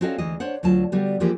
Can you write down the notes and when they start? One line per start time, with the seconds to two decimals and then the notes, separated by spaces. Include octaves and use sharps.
0.01 C4 C#4 F#4 A4 D#5 F5
0.18 D2 E3 G#3 D#5
0.40 D4 C5 C#5 F#5
0.63 D2 F#3 F4 A5
0.92 D3 G3 B3 F#4 G4
1.20 E3 F3 G#3 A#3 C4 G4